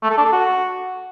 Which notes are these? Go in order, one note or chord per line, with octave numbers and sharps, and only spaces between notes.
A3
A4
D4
A4
F#4